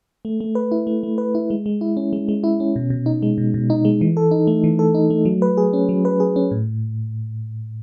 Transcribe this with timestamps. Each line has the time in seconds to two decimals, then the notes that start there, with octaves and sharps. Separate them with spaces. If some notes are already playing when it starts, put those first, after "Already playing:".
0.25 A3
0.40 A3
0.55 B4
0.72 E4
0.87 A3
1.03 A3
1.18 B4
1.35 E4
1.50 G#3
1.66 G#3
1.81 E4
1.97 C#4
2.13 G#3
2.28 G#3
2.44 E4
2.60 C#4
2.76 B2
2.90 B2
3.06 D#4
3.22 G#3
3.38 B2
3.54 B2
3.70 D#4
3.85 G#3
4.01 E3
4.17 A4
4.31 D#4
4.47 A3
4.64 E3
4.79 A4
4.94 D#4
5.10 A3
5.25 F#3
5.42 B4
5.57 G#4
5.73 C#4
5.89 F#3
6.05 B4
6.20 G#4
6.36 C#4
6.51 A2